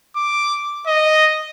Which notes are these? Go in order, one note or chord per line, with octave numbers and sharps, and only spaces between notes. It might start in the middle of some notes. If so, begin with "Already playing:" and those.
D6
D#5